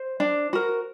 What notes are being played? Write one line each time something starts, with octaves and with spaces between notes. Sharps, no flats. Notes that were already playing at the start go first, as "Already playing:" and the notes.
Already playing: C5
D4
F#4 A#4